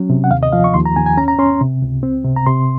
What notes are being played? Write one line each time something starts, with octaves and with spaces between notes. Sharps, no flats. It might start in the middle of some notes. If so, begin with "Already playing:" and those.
Already playing: F#3 C#4
C3
F#5
D#2 F5
D#5
F3 F5
C#6
D#2 C6
A#5
D#2 G#5
G#5
C#4 A#5
A#5
C#4 C6
C3
C#2
C4
C3
A#5
C3 C6